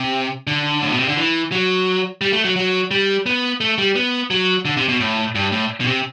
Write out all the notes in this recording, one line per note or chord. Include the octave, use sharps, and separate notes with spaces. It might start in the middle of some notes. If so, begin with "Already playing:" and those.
Already playing: C3
D3
A2
B2
C3
D3
E3
F#3
G3
A3
F#3
F#3
G3
B3
A3
G3
B3
F#3
D3
C3
B2
A2
G2
A2
B2
C3